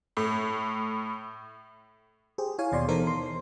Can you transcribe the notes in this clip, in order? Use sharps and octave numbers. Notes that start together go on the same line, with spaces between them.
A2
G4 G#4 C5
E4 C#5 F5 G#5
D#2 B2 D5 C6
E3 B3 D#4 A4 A#4 C5
C6